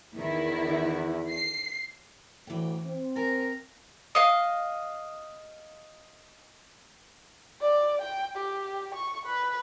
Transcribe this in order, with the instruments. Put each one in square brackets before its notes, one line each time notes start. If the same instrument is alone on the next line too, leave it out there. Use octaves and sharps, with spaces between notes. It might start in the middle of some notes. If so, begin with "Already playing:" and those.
[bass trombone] E2 [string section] D#3 E4
[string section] C7
[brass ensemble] D2 A2 [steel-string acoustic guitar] E3 G5
[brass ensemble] C4
[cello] A#4 [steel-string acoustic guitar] G#5
[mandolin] D#5 F5
[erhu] D5
G5
G4
C#6
B4